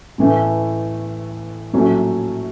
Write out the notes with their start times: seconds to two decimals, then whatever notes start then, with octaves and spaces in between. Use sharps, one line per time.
0.18 A1 A2 E3 A3
1.73 A#1 A2 F#3 A3 C#4